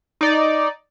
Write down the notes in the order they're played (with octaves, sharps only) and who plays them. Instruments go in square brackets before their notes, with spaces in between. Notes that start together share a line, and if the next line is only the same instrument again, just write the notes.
[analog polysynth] D#4 D5